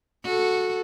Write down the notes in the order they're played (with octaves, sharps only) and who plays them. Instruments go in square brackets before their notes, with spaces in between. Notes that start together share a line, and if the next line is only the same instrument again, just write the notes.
[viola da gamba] F#4 A4